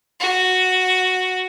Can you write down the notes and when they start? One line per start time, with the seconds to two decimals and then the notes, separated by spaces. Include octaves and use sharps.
0.20 F#4